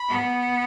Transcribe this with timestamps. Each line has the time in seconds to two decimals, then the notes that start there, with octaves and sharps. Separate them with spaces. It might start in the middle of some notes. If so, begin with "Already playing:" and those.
Already playing: B5
0.08 B3